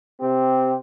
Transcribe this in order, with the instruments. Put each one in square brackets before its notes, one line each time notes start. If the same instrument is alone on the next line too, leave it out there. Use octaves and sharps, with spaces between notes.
[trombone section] C3 C4 G4